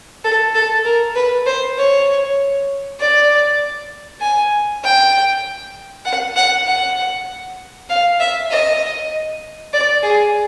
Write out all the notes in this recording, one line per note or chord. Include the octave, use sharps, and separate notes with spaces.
A4
A4
A#4
B4
C5
C#5
D5
G#5
G5
F#5
F#5
F#5
F5
E5
D#5
D5
G#4